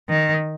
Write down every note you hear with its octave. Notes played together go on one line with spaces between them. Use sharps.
D#3